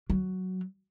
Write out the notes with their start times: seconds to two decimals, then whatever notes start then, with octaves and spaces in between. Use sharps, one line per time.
0.10 F#3